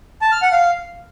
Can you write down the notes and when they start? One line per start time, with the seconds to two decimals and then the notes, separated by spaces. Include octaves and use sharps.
0.22 A5
0.32 F6
0.42 F#5
0.52 F5